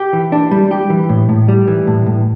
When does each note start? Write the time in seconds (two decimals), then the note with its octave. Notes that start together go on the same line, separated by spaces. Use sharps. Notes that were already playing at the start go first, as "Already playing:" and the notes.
Already playing: G4
0.13 E3
0.32 D4
0.51 G3
0.71 G4
0.90 E3
1.09 A2
1.29 A2
1.48 G3
1.68 E3
1.87 A2
2.06 A2